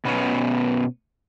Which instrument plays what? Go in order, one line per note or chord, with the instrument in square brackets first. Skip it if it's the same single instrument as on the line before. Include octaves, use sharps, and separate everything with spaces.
[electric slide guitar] B2 B3 C#4